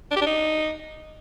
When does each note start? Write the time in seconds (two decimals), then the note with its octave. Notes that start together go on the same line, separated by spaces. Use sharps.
0.11 D4
0.16 G4
0.21 D4
0.26 D#4